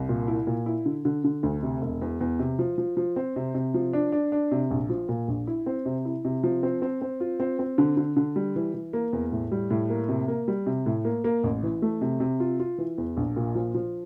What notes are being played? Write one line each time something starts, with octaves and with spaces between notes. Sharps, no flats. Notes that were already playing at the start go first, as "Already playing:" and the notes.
Already playing: C2
A#2
E4
A#2
E4
D3
D3
D3
D2
C3
E1
E2
E2
C3
F3
F3
F3
C4
C3
C3
F3
D4
D4
D4
C3
A#1
F3
A#2
A#1
E4
C4
C3
E4
C3
F3
C4
C4
C4
F4
C4
C4
D3
D3
D3
G3
E3
E3
A#3
E2
A2
G3
A2
A#3
C3
A#3
G3
C3
A2
A#3
A#3
A1
E3
A3
C3
C3
F4
F4
E3
E2
A#1
A#2
F3
F3